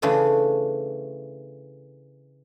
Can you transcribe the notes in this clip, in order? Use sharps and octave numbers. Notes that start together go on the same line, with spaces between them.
C#3 E3 A3 D4 G#4